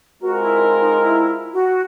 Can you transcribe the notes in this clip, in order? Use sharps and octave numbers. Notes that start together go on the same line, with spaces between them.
G#3 C4 F4 F#4 A#4
E4
D#4
D#4
E4
F#4